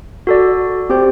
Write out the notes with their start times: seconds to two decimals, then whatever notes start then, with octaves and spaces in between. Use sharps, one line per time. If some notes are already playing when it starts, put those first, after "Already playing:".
0.27 F#4 A4 D5
0.90 C4 G4 C5 G5